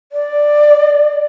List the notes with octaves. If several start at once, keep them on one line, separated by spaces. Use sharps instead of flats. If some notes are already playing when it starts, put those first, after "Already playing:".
D5